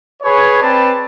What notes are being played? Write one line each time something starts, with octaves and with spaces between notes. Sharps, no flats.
G#4 B4 C#5
C4 B4 D5 A5